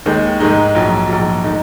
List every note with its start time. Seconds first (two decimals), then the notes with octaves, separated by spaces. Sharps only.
0.06 D#2 D#3 G#3
0.40 G#2 D#3 G#3 D#4
0.75 A#1 G#2 F#3
1.09 A#1 G#2 F#3
1.44 D#3 G#3 D#4